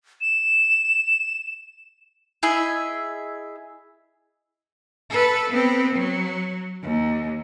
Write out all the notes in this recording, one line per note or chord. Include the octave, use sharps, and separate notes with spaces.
E7
E4 G#4 D#5 E5
A4 B4
B3 C4
F#3
D#2